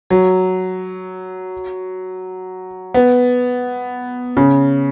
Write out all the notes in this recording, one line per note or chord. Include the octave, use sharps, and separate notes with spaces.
F#3
B3
C#3